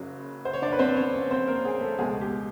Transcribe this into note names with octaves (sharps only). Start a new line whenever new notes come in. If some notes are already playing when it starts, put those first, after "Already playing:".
Already playing: F#1 C#3 F#3
C5
C#5
D4 D5
B4
C4 C5
C#4 C#5
C#4 C#5
C4 C5
A#3 A#4
G#4
A3 A4
C#2 B2 G#3 G#4
G4